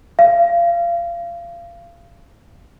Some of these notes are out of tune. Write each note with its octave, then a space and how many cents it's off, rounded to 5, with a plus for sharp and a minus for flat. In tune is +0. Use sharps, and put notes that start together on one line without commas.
F5 -25